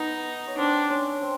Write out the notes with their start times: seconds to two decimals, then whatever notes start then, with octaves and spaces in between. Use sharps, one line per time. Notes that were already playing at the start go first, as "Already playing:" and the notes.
Already playing: B3 D#4 B4
0.47 C#5
0.58 C4 D4 C5
0.90 C#4 C#5
1.21 C4 C5